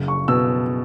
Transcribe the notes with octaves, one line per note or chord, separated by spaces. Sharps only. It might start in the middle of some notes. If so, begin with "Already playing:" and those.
Already playing: F#1
C#6
B2 E6